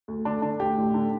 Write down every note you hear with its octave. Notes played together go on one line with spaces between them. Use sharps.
D2
D3 D4
D3 D4
D2 G4
A1
D3